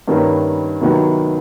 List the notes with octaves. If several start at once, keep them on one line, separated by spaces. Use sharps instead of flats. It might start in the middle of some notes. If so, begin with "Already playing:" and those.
G2 D#3 G3 A#3 C#4
C2 C3 D#3 F#3 B3